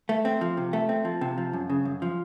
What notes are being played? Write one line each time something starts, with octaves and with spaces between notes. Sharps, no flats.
A3
C4
F3
C3
A3
C4
F3
C3
F3
F#2
C#3
F#2
F3